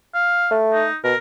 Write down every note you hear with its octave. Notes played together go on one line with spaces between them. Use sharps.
F5
A3
D#4
B2 A#4